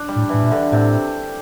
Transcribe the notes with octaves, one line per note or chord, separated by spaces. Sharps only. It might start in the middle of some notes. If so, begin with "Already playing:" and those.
Already playing: D4
G3
A2
A2 E3
A#2
D3
A2 C3